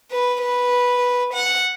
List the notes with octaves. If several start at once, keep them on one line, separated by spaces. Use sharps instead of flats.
B4
B4
F#5